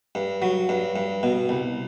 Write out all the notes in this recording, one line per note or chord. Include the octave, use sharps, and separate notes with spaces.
G2
F#3
G2
G2
B2
C2